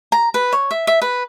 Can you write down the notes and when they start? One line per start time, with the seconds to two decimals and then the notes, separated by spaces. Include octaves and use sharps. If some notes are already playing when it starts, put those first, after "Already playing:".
0.12 A#5
0.34 B4
0.53 C#5
0.71 E5
0.87 E5
1.02 B4